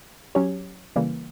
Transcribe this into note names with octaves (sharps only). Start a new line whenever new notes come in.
F#3 C#4 G4 C#5
C#3 E3 G3 A#3